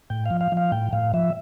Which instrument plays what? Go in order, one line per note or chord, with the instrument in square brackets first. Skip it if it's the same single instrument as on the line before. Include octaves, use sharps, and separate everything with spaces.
[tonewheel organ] A2 G5
F3 F5
F5
F3
F5
A2 G5
A2 F5
F3 E5